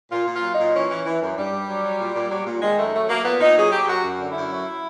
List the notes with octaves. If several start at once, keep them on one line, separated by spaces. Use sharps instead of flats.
A#2 F4
A#2
F4
F#3
A#2 D#4
E3 C#4
E3
E3
F#2
G2 G3
G2
F#3
F#3
A#2
A#2
F#3
A#2
D#3 G#3
F#2 A3
F#3 A3
F#3 A#3
A#2 B3
A#2 D#4
F#3 G#4
F#3 G4
F#2 F#4
F#2
D3
E4
F#2
F#3